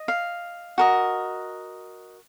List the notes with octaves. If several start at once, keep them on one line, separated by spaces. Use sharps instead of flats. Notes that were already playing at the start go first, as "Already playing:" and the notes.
Already playing: D#5
F5
F#4 A#4 D#5